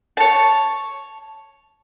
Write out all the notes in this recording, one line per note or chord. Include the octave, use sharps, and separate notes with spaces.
C#5 A5